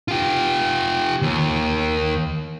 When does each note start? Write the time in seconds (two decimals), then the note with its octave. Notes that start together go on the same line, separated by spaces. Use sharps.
0.08 F4 G4
1.22 D#2